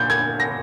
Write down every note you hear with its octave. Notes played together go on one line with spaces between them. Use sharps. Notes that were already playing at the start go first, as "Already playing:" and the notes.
Already playing: A#2 G6 A6
G#6
A#6